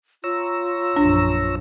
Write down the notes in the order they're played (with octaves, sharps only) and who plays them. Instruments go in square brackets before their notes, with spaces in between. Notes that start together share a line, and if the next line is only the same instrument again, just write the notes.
[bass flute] F4 [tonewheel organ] C#5 A#5 E6
[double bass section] A#1 F#2 F3 [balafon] D4